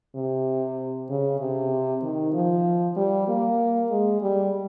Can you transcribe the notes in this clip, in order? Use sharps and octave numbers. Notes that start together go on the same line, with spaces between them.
C3
C#3
C3
D#3
F3
G3
A#3
G#3
G3